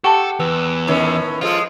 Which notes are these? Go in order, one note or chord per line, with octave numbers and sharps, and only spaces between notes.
G4 A4 F#5 G5 A5 C#6
E2 B4 E6
A2 D#3 C#4
F3 G#3 F4 A4